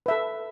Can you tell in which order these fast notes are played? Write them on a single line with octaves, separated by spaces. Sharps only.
B4 E5 A4